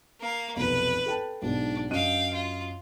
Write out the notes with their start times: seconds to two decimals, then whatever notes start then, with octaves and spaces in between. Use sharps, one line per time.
0.20 A#3 F5
0.56 F1 B1 B4
1.06 A4 G5 A5
1.42 B1 G#2 D4
1.90 F#2 D#5 F5 G5 D#7
2.34 F4